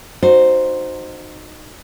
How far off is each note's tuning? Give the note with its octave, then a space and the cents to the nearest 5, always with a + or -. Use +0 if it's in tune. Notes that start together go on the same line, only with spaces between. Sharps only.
D#4 -20 F#4 -15 C5 +0